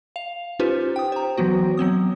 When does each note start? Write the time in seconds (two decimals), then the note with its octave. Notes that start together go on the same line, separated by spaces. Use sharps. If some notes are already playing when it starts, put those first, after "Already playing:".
0.16 F5 F7
0.59 C#4 D#4 F4 G4 B4 C5
0.96 G5 D#6
1.12 C5 A#5
1.37 E3 F#3 B3 F#4
1.77 F#3 B3 C4 D#6